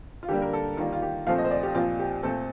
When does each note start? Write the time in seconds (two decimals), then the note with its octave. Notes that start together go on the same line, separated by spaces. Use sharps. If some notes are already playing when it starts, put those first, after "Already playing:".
0.23 F4
0.28 D3 G3 A#3 G4
0.42 A#4
0.53 A4
0.77 D#3 G3 A#3 F4
0.92 F4
1.02 G4
1.26 A#2 F3 A3 C4 F5
1.38 D#5
1.44 C5
1.51 D5
1.63 G4
1.75 A#2 F3 C4 F4
1.99 G4
2.23 A#2 A3 C4 A4